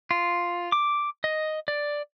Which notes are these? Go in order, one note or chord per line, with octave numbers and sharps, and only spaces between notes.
F4
D6
D#5
D5